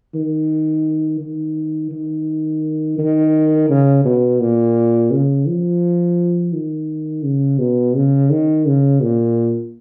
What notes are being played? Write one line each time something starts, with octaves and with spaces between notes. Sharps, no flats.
D#3
D#3
D#3
D#3
C#3
B2
A#2
C#3
F3
D#3
C#3
B2
C#3
D#3
C#3
A#2